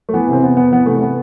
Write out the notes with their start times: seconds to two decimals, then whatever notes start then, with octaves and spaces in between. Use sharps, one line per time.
0.09 A3
0.14 E3 B3
0.28 C3 C4
0.42 E2 B3
0.57 E2 B3
0.72 E3 B3
0.86 C3 A3
0.97 A3
1.02 B3